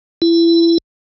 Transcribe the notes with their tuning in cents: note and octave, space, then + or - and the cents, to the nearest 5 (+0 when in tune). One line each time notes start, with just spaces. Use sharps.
E4 +25